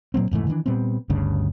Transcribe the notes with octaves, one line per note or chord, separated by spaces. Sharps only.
A#2 F#3 A#3 C4
F1 G#2 E3 A3
D#3 E3 A3 D4
A#2 G3 B3 C4
G1 D2 G2 C#3